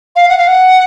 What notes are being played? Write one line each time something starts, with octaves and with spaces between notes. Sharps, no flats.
F5
F#5
F5
F#5